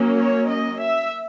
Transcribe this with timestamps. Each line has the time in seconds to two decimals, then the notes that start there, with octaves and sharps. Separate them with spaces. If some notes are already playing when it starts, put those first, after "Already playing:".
Already playing: F#3 A#3 C#4
0.17 C#5
0.47 D#5
0.79 E5